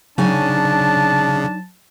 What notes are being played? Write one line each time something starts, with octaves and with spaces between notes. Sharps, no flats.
C#3 F#3 D4 D#4 G#5 A5